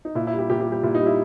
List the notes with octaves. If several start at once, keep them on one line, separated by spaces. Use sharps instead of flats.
D#4
A#2 E4
E4
G3
G4
A#2 G4
G4
G3
G4
A#2 E4
D#4
G3
E4